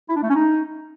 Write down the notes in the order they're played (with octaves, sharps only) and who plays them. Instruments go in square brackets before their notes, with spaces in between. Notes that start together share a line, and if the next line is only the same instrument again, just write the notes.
[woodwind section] E4
D4
A3
C#4
D#4